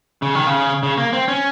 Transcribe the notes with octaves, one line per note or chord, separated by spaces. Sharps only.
C#3
D#3
C#3
C#3
A#3
C4
C#4